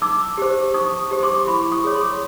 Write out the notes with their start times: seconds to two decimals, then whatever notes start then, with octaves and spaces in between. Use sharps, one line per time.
0.02 D#4 D6 E6
0.38 G4 C5
0.74 D#4 C#6 D#6
1.11 G4 C5
1.23 C6 D6
1.47 E4 B5 C#6
1.72 C#6 D#6
1.84 G#4 C#5
1.95 C6 D6